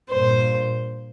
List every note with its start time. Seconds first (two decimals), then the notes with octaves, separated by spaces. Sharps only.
0.10 G2 A#2 C5